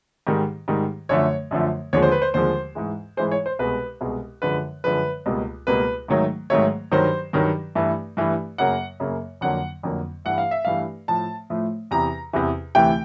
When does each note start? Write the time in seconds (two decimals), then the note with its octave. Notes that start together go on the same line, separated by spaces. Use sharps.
0.27 G#2 D#3 G3
0.68 G#2 D#3 G3
1.09 F#2 D3 F3 A3 C#5
1.51 F#2 D3 F3 A3
1.93 D#2 D3 F3 G#3 C#5
2.03 C5
2.12 B4
2.22 C5
2.34 D#2 D3 F3 G#3 C5
2.75 G#2 E3 G#3
3.17 G#2 E3 G#3 C5
3.31 C#5
3.46 C5
3.59 C2 B2 G#3 B4
4.01 C2 B2 G#3
4.42 F#2 D3 F3 G#3 B4
4.84 F#2 D3 F3 G#3 B4
5.26 C#2 B2 G3 A#3
5.67 C#2 B2 G3 A#3 B4
6.08 G#2 D#3 F#3 A3
6.50 G#2 D#3 F#3 A3 C#5
6.92 G2 D#3 F#3 C5
7.33 G2 D#3 F#3
7.75 G2 E3 A3
8.17 G2 E3 A3
8.58 F#2 C#3 F#3 A#3 F#5
9.00 F#2 C#3 F#3 A#3
9.41 F2 D3 F#3 A#3 F#5
9.83 F2 D3 F#3 A#3
10.25 G2 E3 A3 F#5
10.38 F5
10.51 E5
10.65 G2 E3 A3 F5
11.08 A2 F3 A3 A5
11.50 A2 F3 A3
11.91 E2 C3 E3 A#5
12.33 E2 C3 E3
12.75 D2 C3 E3 A3 G5